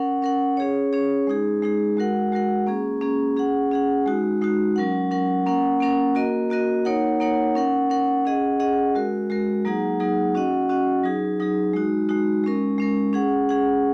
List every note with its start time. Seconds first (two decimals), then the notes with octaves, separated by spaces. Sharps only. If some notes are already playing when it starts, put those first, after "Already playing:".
Already playing: C#4 A#4 F#5
0.22 C#4 A#4 F#5
0.57 C#4 G#4 C#5
0.93 C#4 G#4 C#5
1.27 G#3 D#4 G#4
1.62 G#3 D#4 G#4
1.97 G#3 F#4 A#4 F#5
2.32 G#3 F#4 A#4 F#5
2.67 A#3 C#4 G#4
3.01 A#3 C#4 G#4
3.36 C#4 G#4 F#5
3.71 C#4 G#4 F#5
4.06 G#3 D#4 F#4
4.41 G#3 D#4 F#4
4.76 F#3 C#4 A#4 F#5
5.11 F#3 C#4 A#4 F#5
5.46 A#3 C#4 A#4 F#5
5.80 A#3 C#4 A#4 F#5
6.15 A#3 F#4 A#4 D#5
6.50 A#3 F#4 A#4 D#5
6.85 A#3 D#4 A#4 C#5 F#5
7.20 A#3 D#4 A#4 C#5 F#5
7.55 C#4 A#4 F#5
7.90 C#4 A#4 F#5
8.25 C#4 G#4 D#5 F#5
8.60 C#4 G#4 D#5 F#5
8.95 G#3 F#4 A#4
9.30 G#3 F#4 A#4
9.65 F#3 A#3 D#4 G#4 F#5
10.00 F#3 A#3 D#4 G#4 F#5
10.35 C#4 F#4 D#5 F#5
10.69 C#4 F#4 D#5 F#5
11.04 F#3 D#4 G#4
11.40 F#3 D#4 G#4
11.73 G#3 D#4 F#4
12.09 G#3 D#4 F#4
12.44 G#3 C#4 A#4
12.78 G#3 C#4 A#4
13.13 C#4 G#4 F#5
13.49 C#4 G#4 F#5